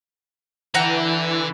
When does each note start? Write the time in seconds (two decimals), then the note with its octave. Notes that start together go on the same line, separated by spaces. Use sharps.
0.74 D3 E3 F#5 G5 A#5